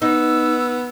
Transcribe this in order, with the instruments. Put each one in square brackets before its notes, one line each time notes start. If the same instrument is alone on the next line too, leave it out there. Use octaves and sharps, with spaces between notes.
[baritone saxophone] B3 [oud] D#4 [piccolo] E6